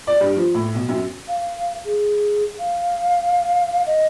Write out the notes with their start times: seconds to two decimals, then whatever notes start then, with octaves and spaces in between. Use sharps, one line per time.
0.07 D5
0.21 G2
0.37 F3
0.55 A2
0.74 B1
0.89 F#2
1.28 F5
1.85 G#4
2.59 F5
3.86 D#5